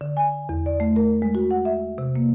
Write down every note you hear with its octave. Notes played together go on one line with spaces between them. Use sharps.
D3
G#5
E2
D5
A3
A#4
G#3
F#4
F#5
E5
C3
A#3